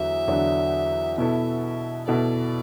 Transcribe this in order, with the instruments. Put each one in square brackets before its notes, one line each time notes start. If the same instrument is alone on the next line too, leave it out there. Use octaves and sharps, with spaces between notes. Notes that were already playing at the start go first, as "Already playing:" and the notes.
Already playing: [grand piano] E2 D3 F#3 [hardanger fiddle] E5
[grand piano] E2 D3 F#3 D4
[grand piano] B2 B3 E4 A4 [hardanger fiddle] E5
[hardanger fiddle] E5
[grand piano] B2 B3 E4 A4 [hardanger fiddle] D5